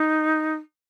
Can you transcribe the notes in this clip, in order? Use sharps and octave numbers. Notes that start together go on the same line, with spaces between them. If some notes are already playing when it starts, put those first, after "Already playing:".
Already playing: D#4